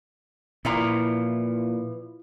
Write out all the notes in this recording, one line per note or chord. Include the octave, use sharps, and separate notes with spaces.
A#2 E3 F3 E4 F4 A#5